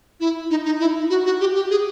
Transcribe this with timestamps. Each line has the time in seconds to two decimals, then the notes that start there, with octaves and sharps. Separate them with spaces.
0.20 E4
0.50 D#4
0.65 D#4
0.80 E4
1.10 F#4
1.26 F#4
1.40 G4
1.55 G4
1.70 G#4